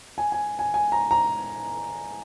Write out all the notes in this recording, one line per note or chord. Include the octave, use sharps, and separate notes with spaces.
G#5
G#5
G#5
G#5
A#5
A#5